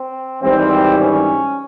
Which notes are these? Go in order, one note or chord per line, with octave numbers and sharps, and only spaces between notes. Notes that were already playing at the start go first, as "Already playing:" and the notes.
Already playing: C4
G#1 G#2 E3 G3 C4
C#4